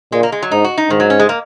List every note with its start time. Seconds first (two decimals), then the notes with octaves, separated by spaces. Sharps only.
0.12 A#2 G#3
0.23 A#3
0.32 G#3
0.42 F#3
0.51 G#2 D#4
0.64 F#4
0.78 D#4
0.90 G#2 D#3
1.00 F#3
1.10 C#4
1.20 G#3
1.29 A#3